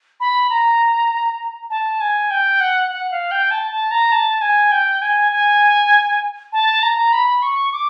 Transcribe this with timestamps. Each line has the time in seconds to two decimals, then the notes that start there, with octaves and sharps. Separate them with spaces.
0.20 B5
0.50 A#5
1.70 A5
2.01 G#5
2.30 G5
2.60 F#5
2.91 F#5
3.11 F5
3.31 G5
3.51 A5
3.71 A5
3.91 A#5
4.12 A5
4.41 G#5
4.72 G5
5.02 G#5
5.32 G#5
6.53 A5
6.82 A#5
7.13 B5
7.42 C#6
7.73 D6